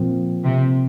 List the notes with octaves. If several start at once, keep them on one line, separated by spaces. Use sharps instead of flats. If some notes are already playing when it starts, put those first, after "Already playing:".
Already playing: A#2 F3 C4
C3